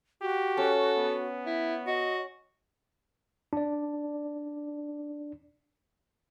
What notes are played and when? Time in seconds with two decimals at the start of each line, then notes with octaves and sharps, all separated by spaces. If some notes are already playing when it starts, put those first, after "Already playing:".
0.22 F#4 G4
0.57 C#4 A4
0.97 B3
1.46 E4
1.87 F#4 D#5
3.53 D4 D5